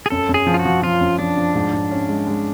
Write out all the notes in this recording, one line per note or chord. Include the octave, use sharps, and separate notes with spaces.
G#4
F#2 A4
F#2
G#4
F3
F4
F#4
F3
F3 F4
F#2
F3 D4
F3
G#2
G#2
C#4
G#3
G#3